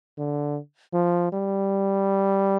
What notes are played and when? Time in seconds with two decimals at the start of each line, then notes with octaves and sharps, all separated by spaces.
0.18 D3
0.94 F3
1.32 G3